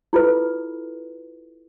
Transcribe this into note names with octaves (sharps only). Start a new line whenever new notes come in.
E4 F4 A4 B4